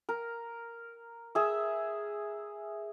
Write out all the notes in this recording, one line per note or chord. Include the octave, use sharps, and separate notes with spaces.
A#4
G#4 E5